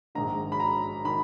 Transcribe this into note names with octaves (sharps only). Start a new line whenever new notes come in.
A#1 G#2 D#3 A#5
B5
A#5
D#3 B5